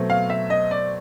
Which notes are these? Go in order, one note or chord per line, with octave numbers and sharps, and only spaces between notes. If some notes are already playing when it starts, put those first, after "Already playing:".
Already playing: B2 F#3 A3 C4
F5
E5
D#5
D5